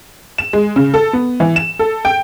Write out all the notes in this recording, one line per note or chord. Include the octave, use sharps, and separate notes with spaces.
E7
G#3
C#3
A4
B3
E3
E7
A4
G5